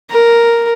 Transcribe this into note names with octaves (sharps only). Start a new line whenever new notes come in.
A#4